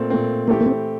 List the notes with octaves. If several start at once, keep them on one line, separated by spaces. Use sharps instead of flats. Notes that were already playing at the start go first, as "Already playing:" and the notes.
Already playing: A#2 A3 C4
A#2 A3 C4
E3 A3 A#3 C4 G4
A#3
C4